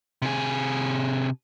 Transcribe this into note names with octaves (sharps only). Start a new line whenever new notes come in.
C3 G#4